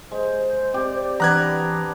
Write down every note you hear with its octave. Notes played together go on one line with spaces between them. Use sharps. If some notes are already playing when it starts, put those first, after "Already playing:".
G#3 C5
C4 G4 D5
E3 B3 D4 B4 A#5 F#6 G#6